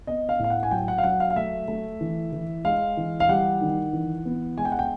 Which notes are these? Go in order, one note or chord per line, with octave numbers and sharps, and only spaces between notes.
B3 D#5
F5
A2 F5
F#5
G#5
F#3 G5
F#5
F5
F#3 F#5
F5
F5
A3 E5
A3
E3
E3
G#3 F5
E3
F5
G3 F#5
D#3
E3
B3
G#3 G#5
G5
F#5
G5